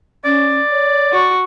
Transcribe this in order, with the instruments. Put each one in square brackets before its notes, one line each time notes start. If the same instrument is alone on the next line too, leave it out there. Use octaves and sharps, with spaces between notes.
[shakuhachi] C#4 [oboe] D5
[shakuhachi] C#5
[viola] F#4